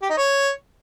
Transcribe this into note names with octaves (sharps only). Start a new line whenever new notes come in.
G4
D#4
C#5